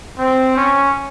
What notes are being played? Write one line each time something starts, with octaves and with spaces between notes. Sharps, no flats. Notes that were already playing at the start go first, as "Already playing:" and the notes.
C4
C#4